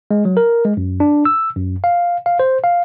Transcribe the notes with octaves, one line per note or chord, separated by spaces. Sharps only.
G#3
F#3
A#4
G#3
F#2
D4
E6
F#2
F5
F5
C5
F5